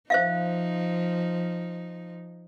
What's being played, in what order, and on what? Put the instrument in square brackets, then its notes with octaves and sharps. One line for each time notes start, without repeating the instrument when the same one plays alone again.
[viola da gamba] F3 D#4 [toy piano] C5 E5 F5